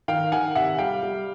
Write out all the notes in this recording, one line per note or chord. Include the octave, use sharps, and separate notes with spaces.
D#3 F5 G5
D#3 F#5 G#5
C3 E5 F#5
G3 F5 G5
G3